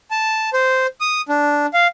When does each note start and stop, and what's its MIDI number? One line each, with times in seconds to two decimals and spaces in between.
0.11 0.50 81
0.53 0.87 72
1.01 1.21 87
1.29 1.66 62
1.74 1.87 77